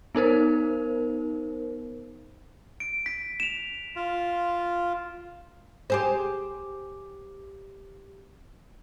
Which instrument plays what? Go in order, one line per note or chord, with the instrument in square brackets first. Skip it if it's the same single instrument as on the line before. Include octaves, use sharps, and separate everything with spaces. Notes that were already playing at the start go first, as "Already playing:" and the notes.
[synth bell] B3 D#4 A#4 C5
[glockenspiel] D7
B6
E7 F7
[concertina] F4
[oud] G4 G#4 C5